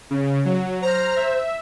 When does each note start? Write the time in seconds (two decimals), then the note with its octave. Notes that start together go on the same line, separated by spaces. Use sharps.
0.10 C#3
0.45 F#3
0.82 C5 A#5 F6
1.16 E5